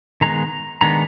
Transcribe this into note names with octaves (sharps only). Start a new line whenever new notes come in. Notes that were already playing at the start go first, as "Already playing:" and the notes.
D#3 G#3 B3 A#5
D#3 G#3 B3 D4 A#5